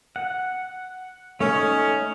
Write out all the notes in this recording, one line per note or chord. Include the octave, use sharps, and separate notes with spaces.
F#5
A3 C#4 D#4